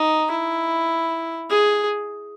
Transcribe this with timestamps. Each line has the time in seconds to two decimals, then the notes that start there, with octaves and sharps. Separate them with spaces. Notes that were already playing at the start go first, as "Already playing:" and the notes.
Already playing: D#4
0.31 E4
1.50 G#4